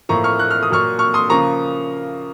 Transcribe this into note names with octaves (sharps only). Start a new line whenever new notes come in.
A2 F3 A#3 A#5 C#6
C#6 F6
F#6
F6
D#6
A#2 F#3 A#3 C#6 F6
C#6 F6
C6 D#6
C#3 F3 A#3 A#5 C#6